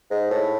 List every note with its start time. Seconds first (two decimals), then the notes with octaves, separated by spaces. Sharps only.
0.11 G#2
0.31 A2